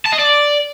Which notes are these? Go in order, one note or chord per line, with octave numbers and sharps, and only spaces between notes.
A5
D#5
D5